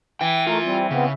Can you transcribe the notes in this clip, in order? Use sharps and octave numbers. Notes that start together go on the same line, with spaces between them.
E3 G5
A3 F4 A#4
G3 C4
C#3 B3 C4